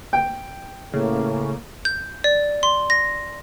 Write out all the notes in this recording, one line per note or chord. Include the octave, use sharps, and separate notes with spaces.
G5
A2 C#3 A#3
G6
D5
C6
A#6